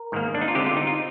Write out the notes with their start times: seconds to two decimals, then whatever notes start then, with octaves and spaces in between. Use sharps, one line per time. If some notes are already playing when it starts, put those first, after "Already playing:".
Already playing: A#4
0.12 G#2 D#3 A#3
0.34 D4
0.41 D#4
0.48 F4
0.55 D3 G#3 C4 G4
0.66 F4
0.77 D#4
0.87 F4